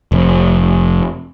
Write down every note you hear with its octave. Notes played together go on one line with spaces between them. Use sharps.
F1